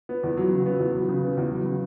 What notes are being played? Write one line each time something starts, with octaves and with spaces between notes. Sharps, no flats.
B3
E2
F#3
C#3
B3
E2
F#3
C#3
B3
E2
F#3
C#3